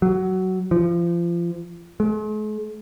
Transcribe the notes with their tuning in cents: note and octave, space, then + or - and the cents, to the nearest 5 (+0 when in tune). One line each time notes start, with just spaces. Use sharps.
F#3 +15
F3 -30
G#3 +45